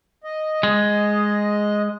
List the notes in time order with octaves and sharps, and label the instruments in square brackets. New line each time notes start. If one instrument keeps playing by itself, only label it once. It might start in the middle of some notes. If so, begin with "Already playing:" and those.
[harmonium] D#5
[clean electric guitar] G#3